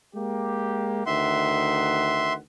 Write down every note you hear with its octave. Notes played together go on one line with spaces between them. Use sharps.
G#3 A#3 G4
D2 D#3 E5 F#5 C6